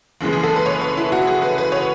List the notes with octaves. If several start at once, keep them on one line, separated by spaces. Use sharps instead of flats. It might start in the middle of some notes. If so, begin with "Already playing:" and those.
F#1 F#2 C#3 E3 G#3
G#4
A4
B4
C#5
B4
E4
F#4
G#4
B4
B4
C#5